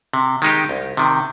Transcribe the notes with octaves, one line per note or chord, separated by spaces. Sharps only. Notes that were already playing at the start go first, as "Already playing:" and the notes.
C3
D#3 G#3 D#4 G4
C2
C3 D#3